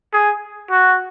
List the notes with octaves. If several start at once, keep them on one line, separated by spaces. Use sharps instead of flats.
G#4
F#4